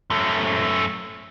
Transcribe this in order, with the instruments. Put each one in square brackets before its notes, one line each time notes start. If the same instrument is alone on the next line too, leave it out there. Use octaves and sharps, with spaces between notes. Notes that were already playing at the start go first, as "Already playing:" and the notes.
[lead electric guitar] F#2 A3